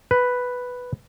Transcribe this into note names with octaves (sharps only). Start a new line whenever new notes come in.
B4